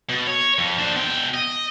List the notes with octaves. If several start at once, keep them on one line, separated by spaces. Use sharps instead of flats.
B2
C#5
F2
D4 C5
B2 G5
D#5